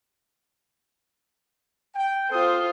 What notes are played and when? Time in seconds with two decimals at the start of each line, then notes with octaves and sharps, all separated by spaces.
1.95 G5
2.30 C4 F4 A4 C5 D#6